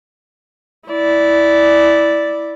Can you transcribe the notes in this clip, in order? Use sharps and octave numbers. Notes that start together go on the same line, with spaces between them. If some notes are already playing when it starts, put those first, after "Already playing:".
E4 D5